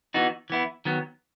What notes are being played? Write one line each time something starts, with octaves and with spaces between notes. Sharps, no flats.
E3 B3 D#4 F#4
E3 B3 E4
D#3 F#3 B3